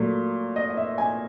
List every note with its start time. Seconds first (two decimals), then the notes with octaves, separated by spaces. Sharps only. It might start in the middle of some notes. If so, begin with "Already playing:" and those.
Already playing: A#2 F#3 A3
0.56 D#5
0.70 D#5
0.77 E5
0.98 G#5